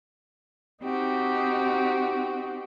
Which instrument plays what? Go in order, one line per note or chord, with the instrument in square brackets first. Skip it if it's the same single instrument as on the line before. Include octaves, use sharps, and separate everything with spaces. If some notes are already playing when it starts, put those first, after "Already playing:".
[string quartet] C4 D#4 F#4 G4